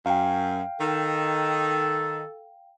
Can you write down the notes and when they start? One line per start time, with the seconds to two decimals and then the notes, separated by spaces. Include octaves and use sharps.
0.06 F#2 F5 G5
0.80 D#3 A4